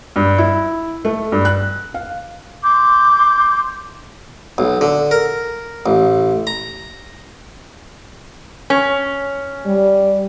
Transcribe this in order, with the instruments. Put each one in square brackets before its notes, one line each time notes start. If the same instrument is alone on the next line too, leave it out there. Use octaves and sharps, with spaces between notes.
[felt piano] G2
E4
A3
G2
F#6
F5
[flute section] C6 D6 G6
[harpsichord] B1
D3
A#4
A1
A#5
[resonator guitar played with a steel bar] C#4
[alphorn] G3